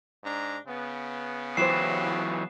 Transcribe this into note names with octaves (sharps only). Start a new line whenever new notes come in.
G#2 D4 A#5
C#3 B3
E3 F#3 E4 G4 C5 C7 E7